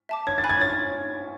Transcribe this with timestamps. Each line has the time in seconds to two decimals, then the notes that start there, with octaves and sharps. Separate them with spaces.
0.09 E5 A5 D6
0.27 C#5 G#6
0.38 A6
0.44 G#5 B5 F#6
0.50 G#6
0.61 C#5 A6